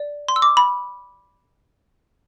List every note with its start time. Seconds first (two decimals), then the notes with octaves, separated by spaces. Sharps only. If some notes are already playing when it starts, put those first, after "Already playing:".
Already playing: D5
0.28 C6
0.36 E6
0.42 D6
0.57 B5